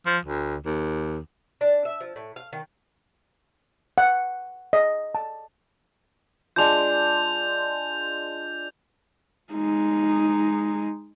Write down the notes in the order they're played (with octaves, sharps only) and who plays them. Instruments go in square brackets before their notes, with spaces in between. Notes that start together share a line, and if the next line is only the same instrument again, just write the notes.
[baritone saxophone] F3
D2
D#2
[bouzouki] D4
E5
F3
A2
F5
D#3
[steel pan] F#5
D#5
A5
[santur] G#3 D4 F4 [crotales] G6 F7
[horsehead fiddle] G#3 D#4